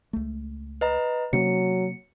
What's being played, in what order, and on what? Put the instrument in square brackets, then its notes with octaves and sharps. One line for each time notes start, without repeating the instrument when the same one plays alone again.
[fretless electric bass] C#2 A3
[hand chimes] B4 D#5 A#5
[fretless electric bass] C3 A#3 C#4 [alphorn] F#3 [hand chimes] C#7